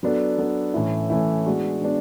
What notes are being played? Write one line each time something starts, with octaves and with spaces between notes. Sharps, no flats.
F#3 B3 D4 A4
F#3 B3 D4 A4
A2 E3 A3 C#4 E4
A2 E3 A3 C#4 E4
G#3 B3 D4 F#4
G#3 B3 D4